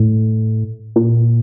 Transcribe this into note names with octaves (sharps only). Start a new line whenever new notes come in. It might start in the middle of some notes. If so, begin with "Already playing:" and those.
Already playing: A2
A#2